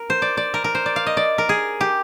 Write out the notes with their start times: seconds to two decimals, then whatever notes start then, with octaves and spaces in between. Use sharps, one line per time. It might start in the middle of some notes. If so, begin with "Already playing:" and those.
Already playing: A#4
0.10 C5
0.22 D5
0.37 D5
0.54 A#4
0.64 A#4
0.75 C5
0.86 D5
0.96 F5
1.06 D#5
1.17 D5
1.38 A#4
1.49 G#4
1.81 G4